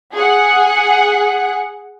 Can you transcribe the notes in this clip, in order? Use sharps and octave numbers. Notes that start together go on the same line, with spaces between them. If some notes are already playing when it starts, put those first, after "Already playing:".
G#4 F#5